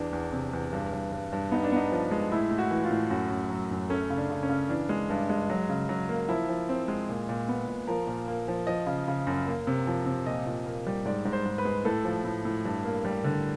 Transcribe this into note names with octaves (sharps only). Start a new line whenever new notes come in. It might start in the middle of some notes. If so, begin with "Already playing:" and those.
Already playing: E2 D4
E2
C3
E2
G2
G2
G2
G2
B3 D#4
D4
B3 D#4
F3
G#3
A2 E4
A2
F#4
E3
F4
A2
F#2 F#4
F#2
F#3
F#2
A3 C#4
C#3
D4
C#3
C#4
C#3
E3 D4
G#3
G2
G#3
F#3
C#3
F#3
A#3
F3 E4
F3
C4
G#3
A#2
A#2
B3
A#2
F3 A#4
A#2
A#3
F3
F3 D#5
C#3
C#3
F#2
A#3
C3
F3
C3
A#2 D#5
A#2
A#3
G3
G#2 D5
G#2
C5
G#2
B4
G#3
A2 A4
F3
A2
A2
G2
A#3
G3
D3